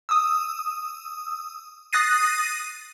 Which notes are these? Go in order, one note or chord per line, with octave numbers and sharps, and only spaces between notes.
D#6 E6
D#6 F#6 A6 A#6 C7 D#7